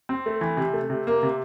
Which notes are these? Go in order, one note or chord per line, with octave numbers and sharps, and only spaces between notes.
C4
A3
E3
C3
A3
C3
A#3
C3